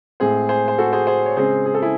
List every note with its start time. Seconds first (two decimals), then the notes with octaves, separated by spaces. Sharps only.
0.20 A2 G#3 C4 G#4 C5
0.49 G#4 C5
0.68 C5
0.78 F#4 A4
0.93 G#4 C5
1.07 G#4 C5
1.26 C#5
1.36 C#3 G#3 C4 G#4 C5
1.66 G#4
1.74 A4
1.82 E4 G#4